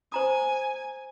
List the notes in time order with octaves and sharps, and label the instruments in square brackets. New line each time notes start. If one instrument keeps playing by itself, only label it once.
[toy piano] C5 A#5 D#6 [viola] G#5